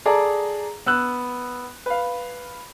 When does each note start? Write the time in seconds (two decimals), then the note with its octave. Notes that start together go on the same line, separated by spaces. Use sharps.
0.06 G#4 A4 D5 A5 A#5
0.86 B3 E6 F#6
1.86 B4 F5